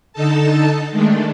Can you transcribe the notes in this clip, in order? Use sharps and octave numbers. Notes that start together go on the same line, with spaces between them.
D3 D#4 A4 A5
D#3 G#3 A3 D4